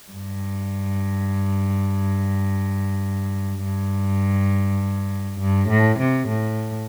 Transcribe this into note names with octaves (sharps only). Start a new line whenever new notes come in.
G2
G2
G2
A2
C3
A2